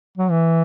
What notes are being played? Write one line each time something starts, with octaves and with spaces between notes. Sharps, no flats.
F#3
E3